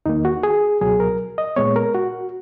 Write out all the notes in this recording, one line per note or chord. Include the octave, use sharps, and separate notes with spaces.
E2 D#3 A#3 D#4
F#4
G#4
C#2 B2 F#3 G#4
A#4
D#5
A#2 G#3 B3 C#5
A#4
F#4